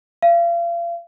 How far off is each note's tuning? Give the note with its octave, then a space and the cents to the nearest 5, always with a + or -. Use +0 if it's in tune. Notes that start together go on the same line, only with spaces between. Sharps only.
F5 -35